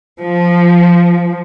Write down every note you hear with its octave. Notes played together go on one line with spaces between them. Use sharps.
F3